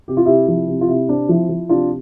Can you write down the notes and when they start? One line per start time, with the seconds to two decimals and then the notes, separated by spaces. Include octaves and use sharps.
0.08 C3 G4
0.17 F4
0.25 C3 E4 G4
0.48 F3 E4
0.68 C3
0.81 F4
0.88 C3 E4
1.09 C4 D4
1.29 F3 E4
1.49 F3
1.69 C3 D4 F4